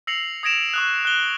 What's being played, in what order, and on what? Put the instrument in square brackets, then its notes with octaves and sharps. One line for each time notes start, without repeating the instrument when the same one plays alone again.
[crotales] E6 A#6 C7 C#7 F7 F#7
D#6 G#6 A#6 D7 E7 F7
C#6 D#6 F#6
F#6 G7